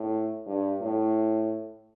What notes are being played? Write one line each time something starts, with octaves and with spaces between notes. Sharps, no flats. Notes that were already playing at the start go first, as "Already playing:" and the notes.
Already playing: A2
G2
A2